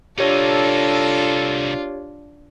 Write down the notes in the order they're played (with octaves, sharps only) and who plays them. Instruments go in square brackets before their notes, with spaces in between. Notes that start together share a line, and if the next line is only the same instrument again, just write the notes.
[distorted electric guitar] C2 D#4 [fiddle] D4 F4 [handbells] G4 C#5 [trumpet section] A4